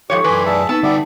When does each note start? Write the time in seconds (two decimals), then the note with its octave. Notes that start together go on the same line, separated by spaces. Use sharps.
0.10 G#2 F3 G4 A4 C#5
0.24 F#2 E3 B4 G#5 C6 D6
0.46 G#4 D5 E5 A5
0.69 B3 D#4 A5 E6
0.83 D3 G3 B3 G4 D5 E5